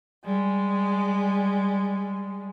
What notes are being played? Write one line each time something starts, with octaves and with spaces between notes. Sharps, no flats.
G3 G#3